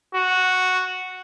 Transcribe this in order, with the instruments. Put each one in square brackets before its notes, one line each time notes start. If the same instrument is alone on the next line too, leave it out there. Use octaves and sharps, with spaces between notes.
[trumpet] F#4